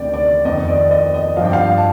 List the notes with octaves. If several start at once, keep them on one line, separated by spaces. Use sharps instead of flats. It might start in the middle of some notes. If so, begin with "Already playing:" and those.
Already playing: D2 C3 D#3 D5 G5
D5
F2 D#3 D#5
D5
D#5
D#5
G2 F3 F5 G5
F5
A5